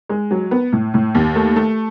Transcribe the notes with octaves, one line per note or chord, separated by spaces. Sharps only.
G#3
F#3
B3
A2
A2
D#2
A3
A3